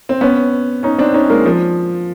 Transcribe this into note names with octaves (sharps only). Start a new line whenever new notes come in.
C4
B3 C#4
C#4 D#4
C4 D4
C#4 D#4
G#3 A#3
F3